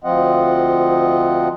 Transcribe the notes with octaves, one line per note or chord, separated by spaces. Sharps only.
D2 F3 C4 F4 D#5 F#5